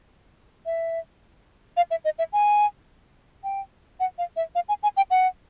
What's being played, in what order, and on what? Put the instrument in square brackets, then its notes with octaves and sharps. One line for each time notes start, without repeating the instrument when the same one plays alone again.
[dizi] E5
F5
E5
D#5
E5
G#5
G5
F#5
F5
E5
F5
G#5
G#5
G5
F#5